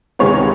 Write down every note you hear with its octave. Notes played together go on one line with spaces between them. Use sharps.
C#2 C3 D#3 G#3 B3 C#5